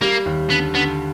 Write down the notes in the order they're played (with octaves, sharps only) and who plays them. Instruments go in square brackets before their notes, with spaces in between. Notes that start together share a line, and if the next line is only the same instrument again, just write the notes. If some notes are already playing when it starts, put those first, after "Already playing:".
[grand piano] G3 [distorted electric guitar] A#3
[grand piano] D#2
[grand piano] D3 [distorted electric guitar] B3
[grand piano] D3 [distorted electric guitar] B3